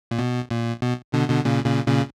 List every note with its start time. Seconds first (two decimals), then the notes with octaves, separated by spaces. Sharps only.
0.11 A#2
0.19 B2
0.51 A#2
0.82 B2
1.13 B2 D3
1.29 B2 D3
1.45 A#2 C#3
1.65 A#2 C#3
1.86 A#2 C#3